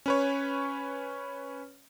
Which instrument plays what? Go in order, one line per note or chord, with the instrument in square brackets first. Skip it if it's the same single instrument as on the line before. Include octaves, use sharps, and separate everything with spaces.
[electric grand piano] C#4 B4 C#5